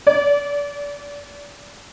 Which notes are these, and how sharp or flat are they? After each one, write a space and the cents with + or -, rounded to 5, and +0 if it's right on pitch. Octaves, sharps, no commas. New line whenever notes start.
D5 -25